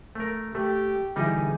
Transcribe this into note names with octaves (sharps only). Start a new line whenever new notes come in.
A3 A#4
A3 G4
B2 D3 E3 G3 D#4 G#4